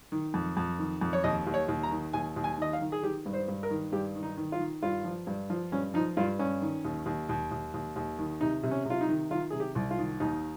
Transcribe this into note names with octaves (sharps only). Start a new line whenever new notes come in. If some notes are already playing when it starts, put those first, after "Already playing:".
D#3
F2
F2
D#3
F2
C#5
D#2 D#5
D#2
C#5
D#2
A#5
D#3
D#2 G#5
D#2
G#5
D#3 D#5
F5
D#3
G#4
D#3 G4
G2
C5
G2
A#4
D#3
G2 G4
D#3
D#4
D#3
F4
D#3
G2 F4
F3
G2
F3
G2 C#4
F3 D#4
G2 F4
G2 C#4
D#3
D#2
D#2
D#2
D#2
D#2
D#2
D#3
C3 D#4
C3
C#4
C3 F4
D#4
D#3
D#3 F4
C3 G#4
G4
C2
F4
D#3
D#2 D#4